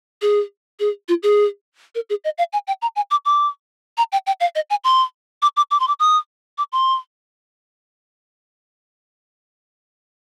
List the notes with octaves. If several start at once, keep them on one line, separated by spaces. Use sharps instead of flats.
G#4
G#4
F4
G#4
A#4
G#4
D#5
F5
G#5
G5
A#5
G#5
D6
D6
A#5
G5
G5
F5
D#5
G#5
C6
D6
D6
D6
C6
D6
D#6
D6
C6